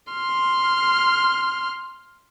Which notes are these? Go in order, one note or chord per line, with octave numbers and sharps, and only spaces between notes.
C6 F6